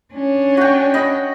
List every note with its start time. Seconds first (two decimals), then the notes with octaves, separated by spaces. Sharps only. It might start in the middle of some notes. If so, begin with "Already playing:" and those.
0.13 C#4 D4
0.57 F#4 G5
0.94 D#5 B5